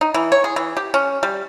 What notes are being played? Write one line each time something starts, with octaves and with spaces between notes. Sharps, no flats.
D#4
E3
C#5
G#4
E3
G4
C#4
G3